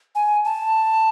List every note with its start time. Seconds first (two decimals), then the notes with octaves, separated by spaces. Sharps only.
0.15 G#5
0.45 A5